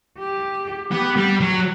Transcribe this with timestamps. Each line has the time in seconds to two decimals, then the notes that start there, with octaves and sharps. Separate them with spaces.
0.19 G4
0.92 B3 G4
1.17 G3
1.41 F#3